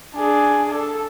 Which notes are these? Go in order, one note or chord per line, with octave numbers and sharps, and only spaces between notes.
D4 G#4
A4